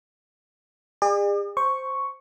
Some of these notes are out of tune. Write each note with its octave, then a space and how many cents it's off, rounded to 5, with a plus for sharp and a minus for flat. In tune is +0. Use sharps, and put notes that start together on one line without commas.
G#4 -45 D5 +40
C5 +0 C#6 +0